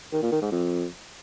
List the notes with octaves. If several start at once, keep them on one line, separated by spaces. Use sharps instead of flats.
D#3
A#2
D#3
G#2
F2